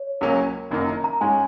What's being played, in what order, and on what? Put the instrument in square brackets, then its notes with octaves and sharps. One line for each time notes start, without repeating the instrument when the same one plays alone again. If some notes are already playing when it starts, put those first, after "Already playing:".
Already playing: [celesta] C#5
[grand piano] C#2 C#3 F#3 A#3 C#4
F#1 F#2 D#3 A#3 D#4
[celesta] A#5
A#5
[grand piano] G#2 G#3 C#4 [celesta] G#5